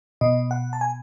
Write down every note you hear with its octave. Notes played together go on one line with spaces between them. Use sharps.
B2 D#5
F#5
A5
G#5